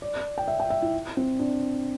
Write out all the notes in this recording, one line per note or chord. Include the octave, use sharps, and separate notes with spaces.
D5
G5
E5
G5
E5
E4
C4
D4